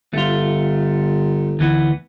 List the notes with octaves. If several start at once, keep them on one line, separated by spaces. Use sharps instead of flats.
G1 A3 F4
D2 E3 B3